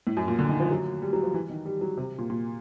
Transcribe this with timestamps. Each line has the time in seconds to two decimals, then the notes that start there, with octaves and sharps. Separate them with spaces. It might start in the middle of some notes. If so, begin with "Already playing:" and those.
0.07 A2
0.17 F#2
0.28 A#2
0.39 D3
0.49 D#3
0.60 F3
0.71 F#3
1.02 G3
1.13 F#3
1.23 F3
1.34 E3
1.49 D#3
1.66 G3
1.81 F#3
1.97 C3
2.18 A#2
2.30 A#2